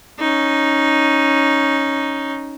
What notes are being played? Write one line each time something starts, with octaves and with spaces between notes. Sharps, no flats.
C#4 D#4